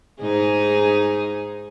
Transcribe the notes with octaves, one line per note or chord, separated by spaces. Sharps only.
G#2 D#4 G#4